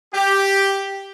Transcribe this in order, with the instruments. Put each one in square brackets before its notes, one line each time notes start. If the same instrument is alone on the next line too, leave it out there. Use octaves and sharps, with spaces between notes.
[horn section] G4